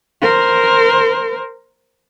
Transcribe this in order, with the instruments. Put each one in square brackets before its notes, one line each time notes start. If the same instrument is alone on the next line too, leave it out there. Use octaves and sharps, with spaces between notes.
[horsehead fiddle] A#4 C5